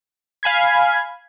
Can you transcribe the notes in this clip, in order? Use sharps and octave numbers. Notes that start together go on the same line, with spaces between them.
F5 G#5 B5 G#6